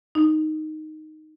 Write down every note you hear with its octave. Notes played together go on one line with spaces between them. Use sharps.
D#4